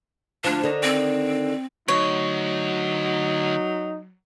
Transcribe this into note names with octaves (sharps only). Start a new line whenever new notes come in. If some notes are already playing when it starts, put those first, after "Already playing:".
D2 F3 D4
D3 D#3
C4
D2 F#3 D#4 C#5